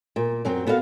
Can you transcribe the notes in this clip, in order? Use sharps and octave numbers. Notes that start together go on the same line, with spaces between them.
A#2
F#2 F#3 C4
B3 F#4 A4 D#5 F5